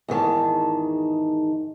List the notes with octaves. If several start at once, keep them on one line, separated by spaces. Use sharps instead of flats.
E2 G#2 D#3 A5